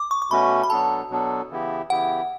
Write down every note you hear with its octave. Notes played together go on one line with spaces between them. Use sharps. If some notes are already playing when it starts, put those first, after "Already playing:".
Already playing: D6
C#6
C#6
B2 A3 C#4 F#4 B4 B5
B5
B2 F#3 B3 D4 A4 A5
B2 F#3 B3 D4 A4
C#3 E3 B3 E4 G4
C#3 E3 B3 E4 G4 F#5